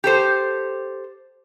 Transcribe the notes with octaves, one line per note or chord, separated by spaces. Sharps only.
G4 A4 C5